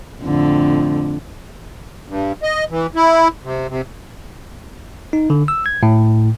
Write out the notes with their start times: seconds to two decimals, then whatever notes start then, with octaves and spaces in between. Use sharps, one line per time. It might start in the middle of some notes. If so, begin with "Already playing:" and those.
0.22 F2 A2 D3
2.08 G2
2.43 D#5
2.70 E3
2.95 E4
3.44 C3
3.69 C3
5.13 D#4
5.30 D3
5.48 E6
5.66 G#6
5.83 A2